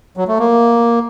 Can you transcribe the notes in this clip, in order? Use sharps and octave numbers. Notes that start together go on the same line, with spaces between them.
F#3
A3
A#3